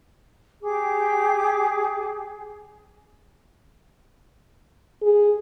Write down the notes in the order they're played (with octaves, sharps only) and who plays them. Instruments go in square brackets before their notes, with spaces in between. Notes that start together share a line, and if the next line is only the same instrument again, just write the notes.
[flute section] G4 G#4 G5 D6
[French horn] G#4